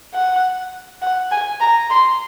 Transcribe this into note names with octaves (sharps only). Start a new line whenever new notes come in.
F#5
F#5
G#5
A#5
C6